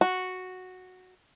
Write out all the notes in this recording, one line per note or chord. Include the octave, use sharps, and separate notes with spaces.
F#4